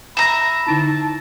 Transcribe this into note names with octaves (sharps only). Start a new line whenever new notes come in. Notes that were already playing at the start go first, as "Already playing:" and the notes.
E5 A#5 B5
D3 D#4 E4 A5